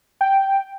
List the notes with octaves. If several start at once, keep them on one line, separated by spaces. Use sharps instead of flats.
G5